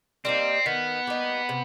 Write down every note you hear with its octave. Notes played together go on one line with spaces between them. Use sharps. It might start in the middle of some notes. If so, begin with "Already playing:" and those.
G3 A#3 C4 D#4
D#3 B3
G3 A#3 D#4
C3